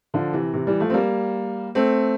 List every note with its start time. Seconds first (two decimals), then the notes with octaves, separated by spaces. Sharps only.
0.14 D3 F3
0.33 C3 E3
0.54 C3 E3
0.67 E3 G3
0.80 F3 A3
0.90 C4
0.94 G3 A#3
1.75 A3 C4